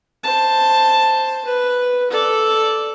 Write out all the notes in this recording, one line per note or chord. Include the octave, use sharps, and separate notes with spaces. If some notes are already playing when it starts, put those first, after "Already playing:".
C5 A5
B4
A4 D5